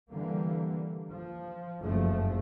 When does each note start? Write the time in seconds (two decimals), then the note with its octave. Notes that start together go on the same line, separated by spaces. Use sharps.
0.10 D3 E3 G3 A#3
1.11 F3
1.81 F#1 G2 F3 A3